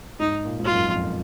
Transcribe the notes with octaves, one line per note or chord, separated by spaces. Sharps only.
G#2 D#4
A#2
G#2 F4
F#2
F2